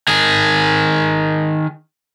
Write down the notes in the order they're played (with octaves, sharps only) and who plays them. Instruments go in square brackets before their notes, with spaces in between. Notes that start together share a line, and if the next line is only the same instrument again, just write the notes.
[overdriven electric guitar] D#3 G#4